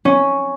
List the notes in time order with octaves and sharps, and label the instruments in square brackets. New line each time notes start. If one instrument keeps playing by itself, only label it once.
[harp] C#4